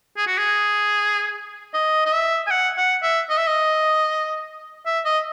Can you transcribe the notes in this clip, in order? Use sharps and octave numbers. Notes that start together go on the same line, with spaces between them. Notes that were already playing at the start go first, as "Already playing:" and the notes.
G#4
F#4
G#4
D#5
D#5
E5
G#5
F#5
F#5
E5
D#5
E5
D#5
E5
D#5